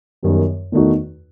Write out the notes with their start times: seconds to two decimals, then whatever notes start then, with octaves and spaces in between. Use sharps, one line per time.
0.23 F#2 D#3 G3 B3
0.72 E2 D#3 A3 D#4 F#4